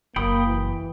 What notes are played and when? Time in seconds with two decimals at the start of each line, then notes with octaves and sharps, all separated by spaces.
0.16 F#1 A#3 G5 B5 D#6
0.46 E3